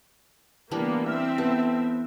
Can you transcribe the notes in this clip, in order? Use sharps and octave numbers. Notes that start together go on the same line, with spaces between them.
E3 G3 A#3 B3 D4
C4 E5 F6
B3 A4